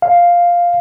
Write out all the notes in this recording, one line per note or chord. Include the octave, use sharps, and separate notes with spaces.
F5